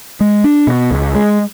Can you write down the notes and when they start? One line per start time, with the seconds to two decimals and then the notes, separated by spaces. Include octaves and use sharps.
0.20 G#3
0.44 D4
0.67 B2
0.91 C#2
1.15 G#3